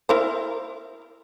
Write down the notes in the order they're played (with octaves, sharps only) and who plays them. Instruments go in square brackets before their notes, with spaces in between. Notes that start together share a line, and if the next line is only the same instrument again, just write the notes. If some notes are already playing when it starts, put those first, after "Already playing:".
[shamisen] E4 A#4 C5